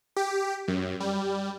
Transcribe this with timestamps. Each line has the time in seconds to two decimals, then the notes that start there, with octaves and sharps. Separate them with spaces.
0.16 G4
0.68 F#2
1.00 G3